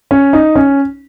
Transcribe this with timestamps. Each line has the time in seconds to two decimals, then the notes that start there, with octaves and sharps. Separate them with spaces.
0.11 C#4
0.33 D#4
0.55 C#4